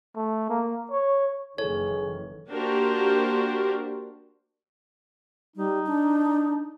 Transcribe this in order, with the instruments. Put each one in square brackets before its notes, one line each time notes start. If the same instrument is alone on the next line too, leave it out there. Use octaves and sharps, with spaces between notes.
[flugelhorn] A3
A#3
C#5
[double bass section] F#1 D#3 E3 [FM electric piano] E4 A4 [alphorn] G#4 [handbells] C#5
[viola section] A#3 D4 F#4 G4 A#4 C5
[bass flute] G3 [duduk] D#4
[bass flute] D4